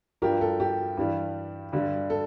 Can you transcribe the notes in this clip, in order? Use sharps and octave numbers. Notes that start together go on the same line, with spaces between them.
G2 F3 G4 A#4
A4
G4
G2 E3 G3
G2 D3 G3
A4